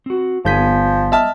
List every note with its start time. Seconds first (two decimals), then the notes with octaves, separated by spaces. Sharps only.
0.06 C4 F#4
0.45 G1 F3 G3 B3 G#5 G6 B6
1.12 D#5 E5 A5 F6